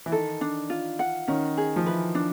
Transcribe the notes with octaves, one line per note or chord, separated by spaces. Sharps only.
E3
D#3 A4
D4
F4
F#5
D#3 C#4
G#4
F3
E3 B4
D4